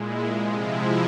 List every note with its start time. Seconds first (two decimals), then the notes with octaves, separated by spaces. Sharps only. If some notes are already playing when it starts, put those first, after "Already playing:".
Already playing: A#2 G#3 E4
0.26 C3 F3 G#3
0.60 E4